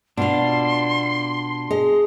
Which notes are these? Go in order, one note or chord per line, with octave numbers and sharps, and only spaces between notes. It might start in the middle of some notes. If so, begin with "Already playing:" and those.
B2 D4 F4 C6
G#4 D#5